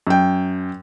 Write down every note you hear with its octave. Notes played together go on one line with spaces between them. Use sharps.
F#2 G5